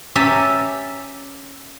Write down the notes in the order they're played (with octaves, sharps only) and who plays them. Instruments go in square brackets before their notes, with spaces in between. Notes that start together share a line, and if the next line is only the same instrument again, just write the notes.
[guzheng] C#4 G4 E5 A5 A#5